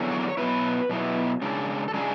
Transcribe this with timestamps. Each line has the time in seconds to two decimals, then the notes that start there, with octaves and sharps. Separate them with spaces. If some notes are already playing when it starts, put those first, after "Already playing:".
Already playing: E2 D3 F#3
0.11 C#5
0.20 D5
0.29 C#5
0.37 B2 F#3 B3 E4 B4
0.89 B2 F#3 B3 E4
1.42 C#3 G#3 D4
1.88 A4
1.94 C#3 G#3 D4 G#4